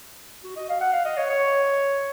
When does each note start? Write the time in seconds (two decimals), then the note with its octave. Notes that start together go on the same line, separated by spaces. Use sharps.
0.44 F#4
0.56 D#5
0.69 F5
0.81 F#5
0.93 F5
1.05 D#5
1.17 C#5
1.30 C#5